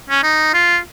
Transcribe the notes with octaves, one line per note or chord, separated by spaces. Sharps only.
C#4
D#4
F4